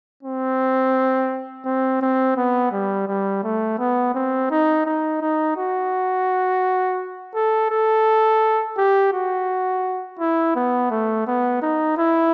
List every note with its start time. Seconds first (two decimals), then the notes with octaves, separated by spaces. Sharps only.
0.23 C4
1.65 C4
2.02 C4
2.37 B3
2.72 G3
3.08 G3
3.43 A3
3.79 B3
4.14 C4
4.51 D#4
4.85 D#4
5.22 D#4
5.57 F#4
7.35 A4
7.71 A4
8.78 G4
9.13 F#4
10.19 E4
10.55 B3
10.91 A3
11.27 B3
11.62 D#4
11.98 E4